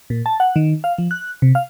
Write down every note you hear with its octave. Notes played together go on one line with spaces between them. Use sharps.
A#2
A5
F#5
D#3
F5
F3
F#6
C3
F5